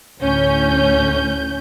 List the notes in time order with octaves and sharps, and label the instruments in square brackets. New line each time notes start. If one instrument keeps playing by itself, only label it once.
[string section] D2 A2 C#4 G6